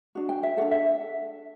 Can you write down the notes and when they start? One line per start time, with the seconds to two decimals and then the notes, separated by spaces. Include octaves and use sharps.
0.15 D4 F#4
0.29 G5
0.43 E5
0.57 D4 F#4 A4 F#5
0.71 E5